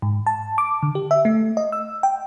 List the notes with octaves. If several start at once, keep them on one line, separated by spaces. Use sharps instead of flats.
G#2
A5
D6
D3
G4
E5
A3
D#5
E6
G5